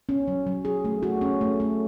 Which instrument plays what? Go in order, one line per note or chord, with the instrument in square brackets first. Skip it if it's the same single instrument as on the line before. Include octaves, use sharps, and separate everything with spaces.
[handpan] C#4
F#3
F#3
G#4
A3
F#4
C#4
A3
A3